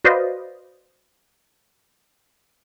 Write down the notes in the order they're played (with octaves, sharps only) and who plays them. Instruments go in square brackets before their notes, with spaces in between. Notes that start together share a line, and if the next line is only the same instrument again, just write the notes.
[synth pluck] F#4 B4 C5 D5 D#5 F5